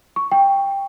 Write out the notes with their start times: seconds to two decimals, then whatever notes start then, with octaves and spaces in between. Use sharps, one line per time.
0.16 C#6
0.32 G5